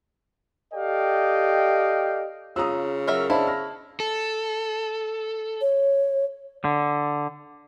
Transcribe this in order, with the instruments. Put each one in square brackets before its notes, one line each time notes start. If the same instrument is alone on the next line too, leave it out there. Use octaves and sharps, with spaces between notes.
[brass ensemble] G4 A4 D5 D#5 F5 G5
[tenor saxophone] C#3 [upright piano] F4 A#5 [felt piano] D#6 E6
[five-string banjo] F#3 A#4 E5
[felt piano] D4 C5 D#5 [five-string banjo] E4 [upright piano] F5 A5 B5
[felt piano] F6 A#6
[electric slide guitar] A4
[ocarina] C#5
[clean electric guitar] D3